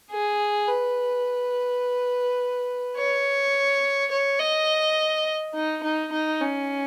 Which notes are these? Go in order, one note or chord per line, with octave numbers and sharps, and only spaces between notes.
G#4
B4
C#5
C#5
D#5
D#4
D#4
D#4
C#4